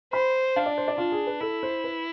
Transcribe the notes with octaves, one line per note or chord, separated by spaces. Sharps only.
C5 B5
D4 F5
D5
C5
D5
D4 F4
G#4
B4
E4 A4
C5
B4